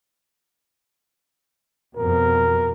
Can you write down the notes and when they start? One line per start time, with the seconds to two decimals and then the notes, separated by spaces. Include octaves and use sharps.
1.97 F2 B2 A#4